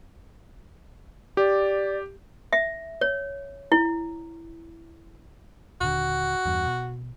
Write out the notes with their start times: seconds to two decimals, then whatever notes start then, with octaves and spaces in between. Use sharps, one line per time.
1.37 G4 D5
2.53 E5
3.01 C#5
3.72 E4
5.81 D#1 D3 F#4
6.46 E2 G2
6.66 B2